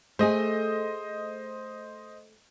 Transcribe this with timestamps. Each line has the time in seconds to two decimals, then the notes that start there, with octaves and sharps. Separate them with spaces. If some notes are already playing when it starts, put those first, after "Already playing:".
0.19 A3 G#4 C5 D#5